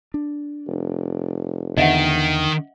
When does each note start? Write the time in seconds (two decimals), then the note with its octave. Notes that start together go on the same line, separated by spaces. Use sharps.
0.14 D4
0.67 F1
1.77 E2 D3 D#3 B3 D#5 E5 F#5